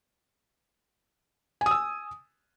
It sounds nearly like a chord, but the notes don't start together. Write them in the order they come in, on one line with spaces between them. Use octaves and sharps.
G#5 D#6 E6